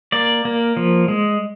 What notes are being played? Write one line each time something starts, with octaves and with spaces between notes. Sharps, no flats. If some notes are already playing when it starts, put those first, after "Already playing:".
A#3 D5
A#3
F3
G#3